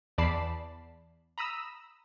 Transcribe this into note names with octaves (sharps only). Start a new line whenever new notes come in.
E2 D5 A5 B5 C7 E7
A#5 B5 D#6 E6